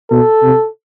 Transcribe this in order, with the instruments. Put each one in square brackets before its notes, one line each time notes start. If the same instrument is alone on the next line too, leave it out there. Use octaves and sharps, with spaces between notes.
[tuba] B2 [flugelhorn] A4
[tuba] C3